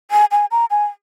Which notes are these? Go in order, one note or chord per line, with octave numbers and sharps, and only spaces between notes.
G#5
G#5
A#5
G#5